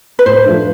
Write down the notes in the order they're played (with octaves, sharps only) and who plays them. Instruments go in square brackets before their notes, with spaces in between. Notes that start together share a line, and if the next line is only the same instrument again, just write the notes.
[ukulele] B4
[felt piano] A2 [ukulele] C5
[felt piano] F3 A3 D4